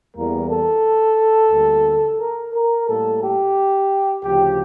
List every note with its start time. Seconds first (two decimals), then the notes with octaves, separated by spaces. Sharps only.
0.16 E2 E3 G3 A#3 A#4
0.50 A4
1.51 D2 D3 G3 A#3
2.19 A#4
2.54 A#4
2.87 A2 G3 A#3 A4
3.22 G4
4.24 D2 C#3 F3 G4